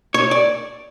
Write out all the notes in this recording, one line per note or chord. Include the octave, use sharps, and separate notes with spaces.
C#5
D5